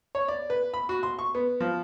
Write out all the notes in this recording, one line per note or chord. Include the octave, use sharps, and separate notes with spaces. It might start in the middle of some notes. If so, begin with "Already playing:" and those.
C#5
D5
B4
B5
F#4
C6
C#6
B3
F3